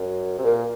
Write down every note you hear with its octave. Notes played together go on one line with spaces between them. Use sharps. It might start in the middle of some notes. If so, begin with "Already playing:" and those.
Already playing: F#2
C3
A#2 A#4